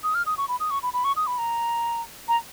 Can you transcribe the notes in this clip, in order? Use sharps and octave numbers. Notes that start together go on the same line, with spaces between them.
D#6
F6
D#6
C#6
B5
D#6
C#6
B5
B5
C#6
D#6
B5
A#5
A#5